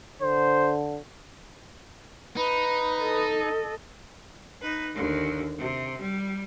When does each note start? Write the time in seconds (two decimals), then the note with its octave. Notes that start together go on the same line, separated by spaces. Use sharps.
0.22 D3 C5
2.37 D#4 B4 B5
3.02 A4 D#5
4.62 D#4 B4
4.95 D#2 D3
5.59 C3
6.02 G3